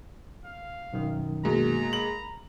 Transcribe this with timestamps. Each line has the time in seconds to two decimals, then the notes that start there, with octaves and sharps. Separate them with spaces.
0.44 F5
0.93 B1 F#2 D#3
1.45 B2 G#3 A#3 A#5
1.93 B5 F#7